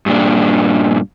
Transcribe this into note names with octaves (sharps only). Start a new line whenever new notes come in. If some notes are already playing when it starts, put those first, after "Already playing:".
G2 A#2 D4